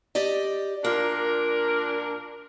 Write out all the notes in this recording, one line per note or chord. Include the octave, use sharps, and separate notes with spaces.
G4 D5 D#5
A#2 D4 F4 A#4